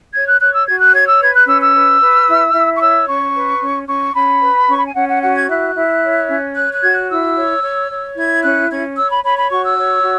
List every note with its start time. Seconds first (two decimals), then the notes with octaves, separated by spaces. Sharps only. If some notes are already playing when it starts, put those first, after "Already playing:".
0.13 C#5 G#6
0.27 F#6
0.40 C#5 F#6
0.53 E6
0.66 F#4 G#6
0.80 F#6
0.93 C#5 G#6
1.07 E6
1.20 B4 G#6
1.34 F#6
1.47 C#4 E6
1.60 E6
1.74 B4
2.01 B4
2.28 E4
2.54 E4
2.77 C#6
2.81 C#5 E6
3.07 C#4 C#6
3.34 B4
3.61 C#4
3.88 C#4 C#6
4.15 C#4 B5
4.42 B4
4.68 C#4 C#6
4.78 B5
4.86 G#5
4.95 C#4 F#5
5.09 F#5
5.21 F#4 F#5
5.35 G#6
5.48 E4 F#6
5.75 E4
6.02 C#5
6.29 C#4
6.55 C#5 F#6
6.73 F#6
6.83 F#4 G#6
6.92 F#6
7.09 E4 E6
7.36 C#5
7.62 C#5
7.90 C#5
8.16 E4 G#6
8.43 C#4 F#6
8.69 C#4 G#6
8.97 C#5 E6
9.10 B5
9.23 C#5 B5
9.37 B5
9.50 F#4 C#6
9.64 E6
9.77 C#5
10.03 F#4